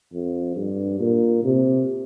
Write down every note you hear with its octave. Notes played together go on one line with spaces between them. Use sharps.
F2
G2
A#2
C3